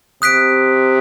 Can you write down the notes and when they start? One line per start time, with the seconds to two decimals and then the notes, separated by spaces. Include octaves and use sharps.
0.22 C3 D#6 F#6 B6 D7